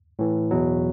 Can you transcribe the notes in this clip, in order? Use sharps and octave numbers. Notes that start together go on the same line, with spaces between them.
A2 E3
E2 B2 F#3